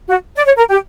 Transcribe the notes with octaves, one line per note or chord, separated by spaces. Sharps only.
F#4
D5
C#5
A#4
G4